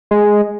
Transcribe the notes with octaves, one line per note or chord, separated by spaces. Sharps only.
G#3